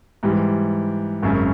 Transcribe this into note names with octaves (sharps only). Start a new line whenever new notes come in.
G#2 E3 G3
G#1 F#2 C#3